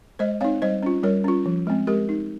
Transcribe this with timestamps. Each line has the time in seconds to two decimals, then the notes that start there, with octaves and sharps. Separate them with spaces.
0.19 G#3 C5 D#5
0.41 C4 D#4 C#5 F5
0.62 G3 C5 D#5
0.83 C#4 F4
1.03 G3 A#4 C#5
1.24 C#4 F4
1.46 F3
1.67 G#3 C4
1.87 G#3 G4 A#4
2.09 D#4